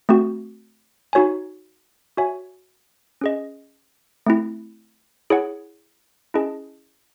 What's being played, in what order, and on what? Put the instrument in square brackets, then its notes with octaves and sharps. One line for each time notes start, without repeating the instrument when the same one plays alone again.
[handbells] A3 C4 F#4
D#4 F#4 C#5 G#5
F#4 C#5 E5 G#5
C#4 G#4 D#5
A3 C4 E4
E4 G#4 C#5 F#5
C#4 E4 G#4 D#5 A5